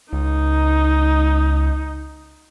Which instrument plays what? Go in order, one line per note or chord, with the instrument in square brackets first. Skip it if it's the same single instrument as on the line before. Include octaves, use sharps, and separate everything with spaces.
[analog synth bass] C#2 [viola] D#4